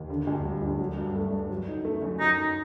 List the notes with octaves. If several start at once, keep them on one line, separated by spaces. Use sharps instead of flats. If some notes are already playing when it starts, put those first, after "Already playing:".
Already playing: D#2
D3
D2
G3
D2
F#3
G2
A3
G2
F#3
D#4
A3
F#2
F#3 D#4
D#4